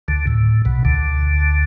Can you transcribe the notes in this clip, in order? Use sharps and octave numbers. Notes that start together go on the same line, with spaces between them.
D2 D3
A2
B1 B2
D2 D3